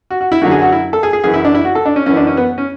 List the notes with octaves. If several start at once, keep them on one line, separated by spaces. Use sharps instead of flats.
F#4
F#4
E4
F#2 D3 F#3 F#4
G#4
F#4
E4
A4
G#4
G#4
F#2 E3 G#4
E4
D4
E4
F#4
A4
D4
C#4
F#2 E3 C#4
D4
C#4
B3
C#4